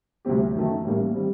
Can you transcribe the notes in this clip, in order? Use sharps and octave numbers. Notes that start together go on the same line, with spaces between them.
D2 C3 G3 C4 G4
F#2 D#3 A3
A1 A2 G3 A#3
D#3 G3 C4